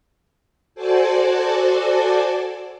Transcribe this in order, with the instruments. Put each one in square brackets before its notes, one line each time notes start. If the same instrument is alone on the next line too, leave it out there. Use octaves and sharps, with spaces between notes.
[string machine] F#4 A4 C5 D5 G#5 A5